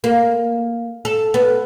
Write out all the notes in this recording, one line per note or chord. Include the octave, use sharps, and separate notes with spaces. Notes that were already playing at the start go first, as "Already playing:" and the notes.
A#3
A4
B3